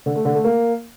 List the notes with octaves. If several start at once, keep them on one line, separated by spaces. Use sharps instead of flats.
D3
A3
D3
A3
A#3